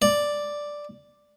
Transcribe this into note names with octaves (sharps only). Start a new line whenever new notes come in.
D5